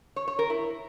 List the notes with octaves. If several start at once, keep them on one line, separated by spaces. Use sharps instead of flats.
C#5
C#5
A#4
E4